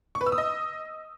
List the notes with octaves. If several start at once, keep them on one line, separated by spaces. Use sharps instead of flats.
C#6
B4
E6
D#6
D#5